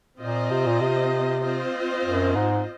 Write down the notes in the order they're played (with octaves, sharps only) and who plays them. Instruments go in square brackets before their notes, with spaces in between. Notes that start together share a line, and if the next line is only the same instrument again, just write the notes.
[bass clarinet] A#2 [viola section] C4 F4 C5 D#5
[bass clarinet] C3
A#2
C3
[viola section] C4 F4 C5 D#5
[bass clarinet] F#2
G#2